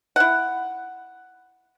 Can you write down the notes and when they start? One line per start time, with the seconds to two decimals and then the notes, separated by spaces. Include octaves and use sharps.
0.16 E4 F#5